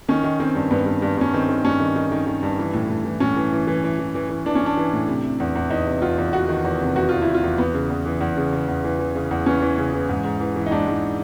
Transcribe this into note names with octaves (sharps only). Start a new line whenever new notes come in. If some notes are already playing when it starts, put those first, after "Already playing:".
D#3 C#4
D#3
D#3 C4
G2
G2 B3
G2
G2
G2 C#4
D#3 C4
D#3
G2 C#4
D#3
D#3
D#3
D#3
G2
E3
A2
A2
E3
A2 C#4
E3
E3
E3
E3
E3
E3
E3
E3 D4
C#4
E3 D4
E3
A2
C3
C3
E2
E2
E2 D#4
C3
E2 F4
E2
E2 F#4
D#3
E2
C3
E2 F#4
E2 F4
E4
C3
F4
E2
E2 B3
C#3
E2
E3
E2
C#3
C#3
E2
E3
E3
C#3
E2
E3 C#4
E3
C#3
E3
G#2
G#2
E3
E3
D#4
G#2 D4
G#2